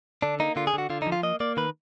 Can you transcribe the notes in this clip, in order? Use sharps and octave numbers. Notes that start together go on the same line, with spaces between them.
D3 D4
A#3 D#4
D3 F4
G#4
D3 F#4
D3 F4
D#4
F3
F4
A#3 D#5
A#3 D5
D#3 B4